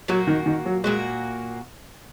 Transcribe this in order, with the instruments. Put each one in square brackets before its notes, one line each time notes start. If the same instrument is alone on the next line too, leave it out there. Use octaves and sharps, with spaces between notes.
[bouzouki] A#2 A#3 F#4 [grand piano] F#3
[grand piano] D#3
D#3
F#3
[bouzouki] A#2 A#3 F#4 [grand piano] G#3